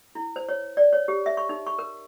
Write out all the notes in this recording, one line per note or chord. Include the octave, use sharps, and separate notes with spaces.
E4
C5
C#5
D5
C#5
G4
E5
C#6
D#4
C#6
A#4